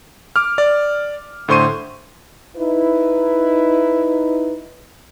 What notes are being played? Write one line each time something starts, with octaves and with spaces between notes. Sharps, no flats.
D6 F6
D5
A2 D3 C5 C6 C#6 D#7
D#4 E4 B4